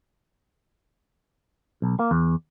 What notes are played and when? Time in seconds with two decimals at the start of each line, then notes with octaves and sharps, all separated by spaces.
1.82 B1
1.99 A#3
2.11 E2